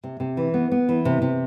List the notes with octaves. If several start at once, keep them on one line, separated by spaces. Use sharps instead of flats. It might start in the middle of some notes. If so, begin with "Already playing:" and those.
C3
C3
E3
B3
B3
E3
C3
C3